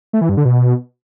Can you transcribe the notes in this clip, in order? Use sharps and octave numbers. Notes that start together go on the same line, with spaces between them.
A3
E3
G2
D3
B2